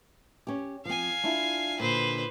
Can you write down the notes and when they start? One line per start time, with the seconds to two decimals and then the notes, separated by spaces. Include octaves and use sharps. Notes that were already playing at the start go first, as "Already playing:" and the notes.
0.47 C#4 G4
0.85 F3 C4 F5 G#5
1.24 D4 E4 F4
1.80 A#2 D3 B4 C5